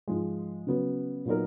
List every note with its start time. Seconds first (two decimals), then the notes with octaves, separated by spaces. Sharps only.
0.08 G#2 F3 G#3
0.67 C#3 F#3 B3 F#4 B4
1.26 A#2 F#3 B3 D#4 A#4